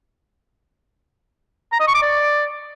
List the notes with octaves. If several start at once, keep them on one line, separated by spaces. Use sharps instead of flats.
A#5
D#5
C#6
D6
D5